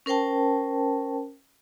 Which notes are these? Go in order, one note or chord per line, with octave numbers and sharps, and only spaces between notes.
C#4 A#4 C5 G5 A5